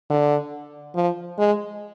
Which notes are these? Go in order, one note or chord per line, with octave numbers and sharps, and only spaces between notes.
D3
F3
G#3